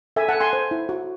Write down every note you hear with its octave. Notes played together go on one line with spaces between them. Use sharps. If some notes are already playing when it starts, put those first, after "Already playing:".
A4 E5 G#5
F#5 A5
A4
G#5 C6
C5
E4
F#4